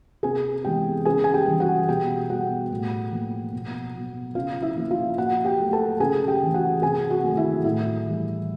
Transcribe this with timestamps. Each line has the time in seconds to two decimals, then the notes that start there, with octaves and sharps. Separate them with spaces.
0.23 C3 G#4 G#5
0.64 E3 G#3 B3 G4 G5
1.05 C#3 G#4 G#5
1.24 G#5
1.34 G4 G5
1.46 E3 G3
1.60 F#4 F#5
1.88 B2 G4 G5
2.29 G3 B3 F#4 F#5
2.71 A2
3.12 F3 A#3
3.53 B2
3.95 F#3 B3
4.35 C#3 F4 F5
4.62 E4 E5
4.76 F3 A#3
4.91 F4 F5
5.18 A#2 F#4 F#5
5.45 G4 G5
5.58 F#3 A3
5.73 A4 A5
6.00 C#3 G#4 G#5
6.27 G4 G5
6.41 E3 A3
6.54 F#4 F#5
6.82 C3 G#4 G#5
7.10 F#4 F#5
7.24 D#3 F#3 A3
7.37 E4 E5
7.64 A2 E4 E5
8.06 E3 G3